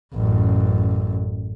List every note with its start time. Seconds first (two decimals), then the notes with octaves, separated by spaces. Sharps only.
0.14 A1 F#2